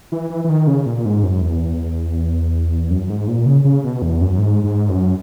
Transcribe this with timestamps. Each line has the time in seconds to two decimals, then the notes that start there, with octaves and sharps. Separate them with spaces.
0.12 E3
0.30 E3
0.44 E3
0.49 D#3
0.67 C#3
0.86 A#2
1.05 G#2
1.23 F#2
1.41 E2
2.90 F#2
3.09 G#2
3.28 A#2
3.46 C#3
3.64 C#3
3.84 B2
4.02 E2
4.21 F#2
4.39 G#2
4.64 G#2
4.89 F#2